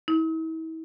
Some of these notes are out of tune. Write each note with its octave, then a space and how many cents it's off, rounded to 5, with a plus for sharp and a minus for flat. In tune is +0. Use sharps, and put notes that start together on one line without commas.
E4 -40